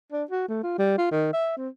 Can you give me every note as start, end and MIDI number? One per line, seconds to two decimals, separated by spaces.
0.12 0.23 62
0.31 0.46 66
0.48 0.59 57
0.63 0.76 65
0.78 0.96 55
0.98 1.10 65
1.11 1.29 51
1.33 1.54 76
1.57 1.68 60